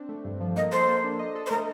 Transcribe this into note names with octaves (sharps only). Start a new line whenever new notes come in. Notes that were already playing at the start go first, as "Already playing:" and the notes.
Already playing: C4 D4
A3
G2
F3
A#3 D#5
A4 C5
A#3
D4
D#5
A4
C5
A3 A#4